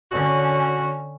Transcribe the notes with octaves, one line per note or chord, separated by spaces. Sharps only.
D3 C#4 F#4